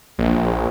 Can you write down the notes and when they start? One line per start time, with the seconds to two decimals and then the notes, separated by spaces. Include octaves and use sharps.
0.18 A#1